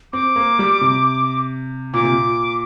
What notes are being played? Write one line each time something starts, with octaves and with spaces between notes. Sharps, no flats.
C4 D6
A#3
G3
C3
A#2 D6
C3
A#2